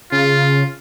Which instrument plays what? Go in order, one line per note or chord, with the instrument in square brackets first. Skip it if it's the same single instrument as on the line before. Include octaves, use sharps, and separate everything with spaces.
[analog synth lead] C#3 [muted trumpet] F4